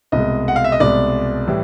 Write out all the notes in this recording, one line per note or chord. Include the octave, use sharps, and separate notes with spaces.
C2 B2 G#3 D#5
F#5
F5
E5
D#5
C2 B2 G#3 D5
A2 E3 G3